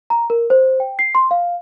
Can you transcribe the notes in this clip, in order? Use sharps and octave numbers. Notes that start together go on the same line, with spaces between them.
A#5
A#4
C5
G5
C7
C6
F5